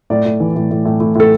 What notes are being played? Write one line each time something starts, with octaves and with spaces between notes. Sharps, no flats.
A2 D5
A2
E3
A2
A2
A2
A2
A2 A4